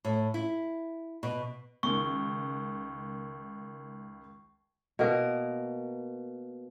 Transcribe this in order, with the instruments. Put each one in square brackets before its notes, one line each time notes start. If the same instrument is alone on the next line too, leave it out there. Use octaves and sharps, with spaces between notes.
[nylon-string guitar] A2
E4
B2
[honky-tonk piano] C#2 D#3 [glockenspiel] C#6
[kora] B2 A#3 A#4